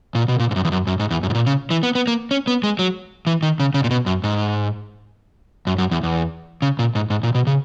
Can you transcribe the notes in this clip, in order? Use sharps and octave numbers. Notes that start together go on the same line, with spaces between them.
A#2
B2
A#2
G#2
F#2
E2
F#2
F#2
G#2
E2
F#2
G#2
A#2
C#3
E3
B3
B3
A#3
C#4
B3
G#3
F#3
E3
D#3
C#3
C#3
A#2
B2
F#2
G#2
F#2
F#2
E2
E2
C#3
A#2
G#2
G#2
A#2
B2
C#3